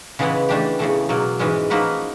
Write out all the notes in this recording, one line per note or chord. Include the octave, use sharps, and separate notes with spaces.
C#3 E3 G#3 B3 E4
E3 A3 D4 G4
E2 C#3 E3 A3
B2 F#3 A#3
G#2 E3 G#3 C#4
F3 A#3 D#4 F#4 B4